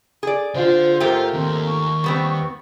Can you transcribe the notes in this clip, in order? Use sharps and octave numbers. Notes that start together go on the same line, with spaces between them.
G#4 D5
D3 D4 F4 C5
G#2 A3 F4 G4 A#4
D#2 C4
C#6
G3 B3 C4